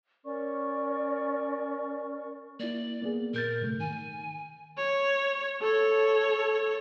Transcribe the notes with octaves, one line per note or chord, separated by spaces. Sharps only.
C#4 A#4 D5 C#6
A#3 E4 D5
A#3 B3 G#4
A#2 A#4 G6 A6
G#2 C3 A3
D#3 G#5
C#5
A4 C#5